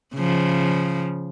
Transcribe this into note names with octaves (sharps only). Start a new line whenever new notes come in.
C#3 F3